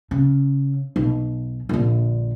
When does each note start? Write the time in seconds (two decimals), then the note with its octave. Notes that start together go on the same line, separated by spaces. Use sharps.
0.11 C#3
0.96 B1
1.69 A#1 D3